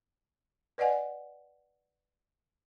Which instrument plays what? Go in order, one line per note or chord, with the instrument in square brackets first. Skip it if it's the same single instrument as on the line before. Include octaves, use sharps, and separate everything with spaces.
[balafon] B4 D5 D#5 F#5 G#5